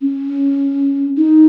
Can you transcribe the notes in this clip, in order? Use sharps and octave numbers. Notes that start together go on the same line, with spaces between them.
C#4
D#4